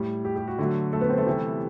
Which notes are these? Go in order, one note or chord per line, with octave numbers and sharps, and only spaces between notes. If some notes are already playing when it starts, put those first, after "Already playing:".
Already playing: A2 G3
G4
G4
F#4
D3 F#3 A3
A3 A4
B3 B4
C4 C5
A3 A4
C3 E3 G3